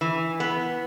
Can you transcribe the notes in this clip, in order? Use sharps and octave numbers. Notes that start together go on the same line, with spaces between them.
E3
B3